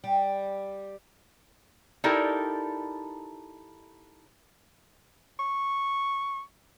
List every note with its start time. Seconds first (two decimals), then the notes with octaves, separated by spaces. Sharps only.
0.04 G3
2.04 D#4 E4 G4 A4 A#4 D5
5.39 C#6